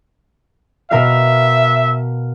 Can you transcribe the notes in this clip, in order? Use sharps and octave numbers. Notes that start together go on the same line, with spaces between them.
B2 A#4 E5 F5